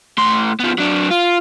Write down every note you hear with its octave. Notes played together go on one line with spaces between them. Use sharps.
A2 C6
F3 B3
F#3 D4
F4